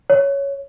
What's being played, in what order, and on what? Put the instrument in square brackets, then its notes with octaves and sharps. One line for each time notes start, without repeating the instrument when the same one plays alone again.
[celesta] C#5